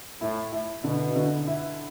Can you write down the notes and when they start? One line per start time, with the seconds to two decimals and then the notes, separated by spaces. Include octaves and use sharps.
0.21 A2 E4
0.52 E4
0.84 B2 D3
1.16 D3
1.47 E4